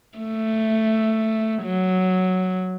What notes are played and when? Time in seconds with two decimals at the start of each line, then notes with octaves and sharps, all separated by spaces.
0.18 A3
1.63 F#3